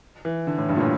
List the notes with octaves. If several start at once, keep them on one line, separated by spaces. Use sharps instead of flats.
E3
D3
A2
G2
A#2
A2